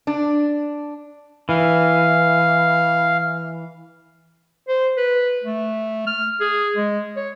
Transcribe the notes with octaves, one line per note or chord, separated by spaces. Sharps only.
D4
E3 F5
C5
B4
A3
F6
G#4
G#3
C#5